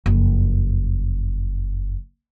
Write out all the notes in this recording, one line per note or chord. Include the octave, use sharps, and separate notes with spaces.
F#1 F2